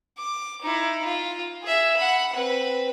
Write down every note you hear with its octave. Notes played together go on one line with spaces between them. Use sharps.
D6
D#4 E4
F4
G#4 E5
F#5 B5
C4 B4